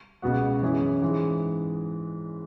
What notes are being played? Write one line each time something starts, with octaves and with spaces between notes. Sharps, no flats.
C#2 B2 B3 F#4
F#2 E3 C#4 E4 G#4
G#2 E3 G#3